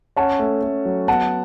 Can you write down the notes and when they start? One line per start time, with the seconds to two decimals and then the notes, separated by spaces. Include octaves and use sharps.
0.16 C#4 F#5 A5
0.39 A3
0.63 A3
0.85 F#3
1.08 B3 F#5 A5